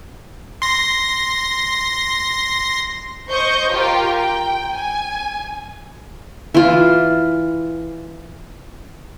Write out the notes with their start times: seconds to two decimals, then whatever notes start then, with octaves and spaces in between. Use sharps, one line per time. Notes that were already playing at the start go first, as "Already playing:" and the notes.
0.62 C6 A#6
3.31 C5 D#5 C#6 G6
3.72 F4 G4 A#4 G5
4.19 G5
4.75 G#5
6.54 E3 F4